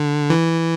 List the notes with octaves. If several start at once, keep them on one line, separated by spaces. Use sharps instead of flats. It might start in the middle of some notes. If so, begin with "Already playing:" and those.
Already playing: D3
E3